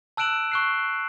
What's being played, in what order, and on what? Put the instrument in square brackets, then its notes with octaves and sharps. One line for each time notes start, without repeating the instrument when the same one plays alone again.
[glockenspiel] A5 E6 F#6 D7 E7 F#7
C#6 F#6 C7